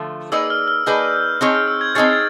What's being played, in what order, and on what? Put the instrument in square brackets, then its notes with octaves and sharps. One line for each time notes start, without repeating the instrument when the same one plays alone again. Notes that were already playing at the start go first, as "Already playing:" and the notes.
Already playing: [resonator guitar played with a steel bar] D3 F3 A3 F4
[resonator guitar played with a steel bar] A#3 D#4 G#4 B4 D5 [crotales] E6
[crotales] F6
F6
[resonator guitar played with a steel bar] A#3 D#4 G#4 B4 D5 [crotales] G6
[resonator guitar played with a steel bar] C4 D#4 G#4 C#5 [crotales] F6
[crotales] F6
E6
G#6
[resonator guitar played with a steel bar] C4 D#4 G#4 C#5 [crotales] A6
[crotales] A6